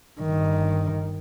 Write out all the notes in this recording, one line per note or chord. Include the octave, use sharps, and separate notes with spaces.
G1 D#3